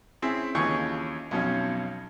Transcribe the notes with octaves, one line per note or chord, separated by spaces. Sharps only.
C4 C#4 E4 G#4
D#2 C#3 E3 F3 C#4 C#6
B1 F2 B2 C#4